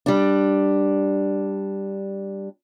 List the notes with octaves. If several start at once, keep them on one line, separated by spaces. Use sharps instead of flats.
G3 D4